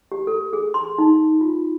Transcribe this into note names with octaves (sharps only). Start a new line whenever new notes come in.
G4
A4
G#4
C6
D#4
F4